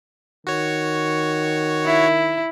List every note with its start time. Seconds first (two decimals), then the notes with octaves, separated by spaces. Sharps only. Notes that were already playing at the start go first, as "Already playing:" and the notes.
0.47 D#3 F#4 C#5
1.86 E4